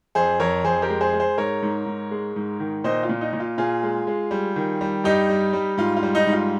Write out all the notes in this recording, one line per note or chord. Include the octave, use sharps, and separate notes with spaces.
F2 G#4 C5
F2 A#4 C#5
F2 G#4 C5
G4 A#4
G#3
G#4 C5
G#3
G#4 C5
G#2 A#4 C#5
G#2
G#2
G#3
G#2
D#3
A#2 C5 D#5
F4
A#2
D#4
A#2
F4
A#2 F4 G#4
G#3
G#3
G3
D#3
G3
G2 D#4 G4
G3
G3
G#2 F4
F4
G3
D#4
G#2
F4